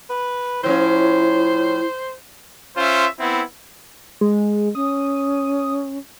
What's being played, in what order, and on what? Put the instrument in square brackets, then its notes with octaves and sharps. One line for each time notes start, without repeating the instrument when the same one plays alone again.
[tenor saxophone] B4
[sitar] A2 F3 C#4 [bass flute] E4 [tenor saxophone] C5
[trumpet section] C#4 F4 C5 E5
B3 C4 E4
[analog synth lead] G#3
[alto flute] C#4 [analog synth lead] D#6